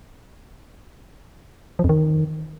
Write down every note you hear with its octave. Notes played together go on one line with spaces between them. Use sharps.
F3
F2
D#3